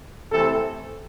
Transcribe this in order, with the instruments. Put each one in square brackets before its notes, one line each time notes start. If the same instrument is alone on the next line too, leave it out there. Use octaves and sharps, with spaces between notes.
[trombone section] C3 E3 A3 C4 A4